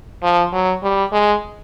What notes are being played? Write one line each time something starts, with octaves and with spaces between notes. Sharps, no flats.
F3
F#3
G3
G#3